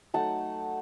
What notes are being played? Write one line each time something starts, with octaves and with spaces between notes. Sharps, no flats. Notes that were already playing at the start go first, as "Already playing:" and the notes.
F#3 A3 D#4 F#5 A5